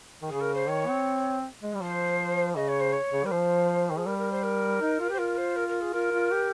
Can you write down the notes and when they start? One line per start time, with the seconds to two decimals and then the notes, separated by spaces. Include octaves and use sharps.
0.22 D#3
0.28 C#3 G#4
0.41 A#4
0.54 C5
0.68 D#3 C#5
0.87 C4
1.63 G#3
1.74 G3
1.81 F3 C5
2.56 C#3 D#5
2.68 C#5
2.80 C5
2.93 C#5
3.12 C#3
3.25 G3 A#4
3.31 F3 C5
3.90 D#3
3.95 F3 G#4
4.06 G3 A#4
4.18 A#4
4.31 C5
4.43 A#4
4.80 D#4
5.00 F4
5.10 G4
5.13 C5
5.18 F4 A#4
5.38 C5
5.56 A#4
5.68 A#4
5.81 G#4
5.93 F4 A#4
6.12 F4
6.31 G4